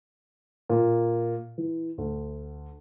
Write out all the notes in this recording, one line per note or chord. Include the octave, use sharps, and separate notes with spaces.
A#2
E3
D2